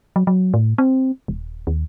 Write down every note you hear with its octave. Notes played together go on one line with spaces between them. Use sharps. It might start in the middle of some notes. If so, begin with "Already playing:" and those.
F#3
F#3
A2
C4
D#1
D#2